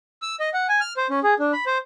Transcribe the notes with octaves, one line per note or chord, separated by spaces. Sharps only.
E6
D#5
F#5
G#5
F6
C5
C#4
G#4
D4
B5
C5